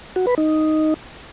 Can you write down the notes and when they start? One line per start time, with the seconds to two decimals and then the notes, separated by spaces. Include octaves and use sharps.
0.16 F#4
0.27 B4
0.38 D#4